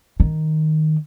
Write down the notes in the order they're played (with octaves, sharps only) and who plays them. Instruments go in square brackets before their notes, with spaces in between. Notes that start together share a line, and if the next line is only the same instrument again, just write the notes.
[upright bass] D#3